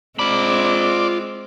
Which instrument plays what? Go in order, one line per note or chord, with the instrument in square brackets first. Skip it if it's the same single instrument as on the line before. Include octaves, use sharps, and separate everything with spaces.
[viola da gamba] G#3 C4 [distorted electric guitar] F4 B5 [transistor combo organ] D5